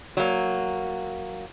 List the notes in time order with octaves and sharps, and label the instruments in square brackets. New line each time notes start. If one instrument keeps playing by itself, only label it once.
[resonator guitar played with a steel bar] F#3 A#3